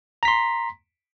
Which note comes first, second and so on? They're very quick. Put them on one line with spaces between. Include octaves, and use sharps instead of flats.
A#5 B6 C6